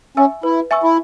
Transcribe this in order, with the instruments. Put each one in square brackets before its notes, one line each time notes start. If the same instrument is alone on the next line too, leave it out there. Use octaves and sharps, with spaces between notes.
[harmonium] C#4 [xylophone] E5 G#5 C#6 E6
[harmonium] E4 [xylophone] B4
[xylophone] E5 G#5 C#6 E6
[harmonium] E4